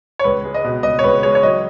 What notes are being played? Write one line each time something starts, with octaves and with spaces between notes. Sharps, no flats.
C#5
C#2 B4
G#3
D#5
B2
C#2 D#5
C#5
C#2 B4
G#3 C#5
C#5
F#3 D#5